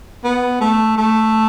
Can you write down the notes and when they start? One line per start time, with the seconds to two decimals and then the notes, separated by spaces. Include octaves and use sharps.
0.24 B3
0.61 A3
0.97 A3